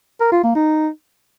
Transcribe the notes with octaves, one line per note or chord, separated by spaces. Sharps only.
A#4
F4
A#3
D#4